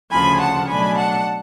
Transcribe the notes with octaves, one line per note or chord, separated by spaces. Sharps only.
D2 C#3 F3 G#5 B5
F#5 A5
B2 F#3 A3 D4 G#5 B5
F#5 A5